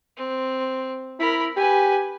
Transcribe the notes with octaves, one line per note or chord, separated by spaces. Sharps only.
C4
E4 A#4 B5
G4 B4 G#5